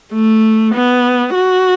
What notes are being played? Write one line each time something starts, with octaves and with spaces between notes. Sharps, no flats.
A3
B3
F#4